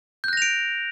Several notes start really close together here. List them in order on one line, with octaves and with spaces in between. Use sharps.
G6 F#6 A#6 F7 D7